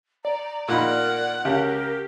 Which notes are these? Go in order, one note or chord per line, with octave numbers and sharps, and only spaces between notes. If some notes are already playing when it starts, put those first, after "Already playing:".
D5 A#5
A#2 D#4 A#4 F#5 B5
C#2 G4 A#4